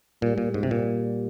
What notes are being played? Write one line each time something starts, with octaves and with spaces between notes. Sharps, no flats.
A#2 G3
A#2
G#2
C3
A#2